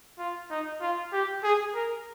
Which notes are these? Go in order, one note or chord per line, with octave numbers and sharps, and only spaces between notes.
F4
D#4
F4
G4
G#4
A#4